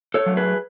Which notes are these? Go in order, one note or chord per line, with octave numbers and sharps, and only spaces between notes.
A4 C#5
F#3 A3
G#4 B4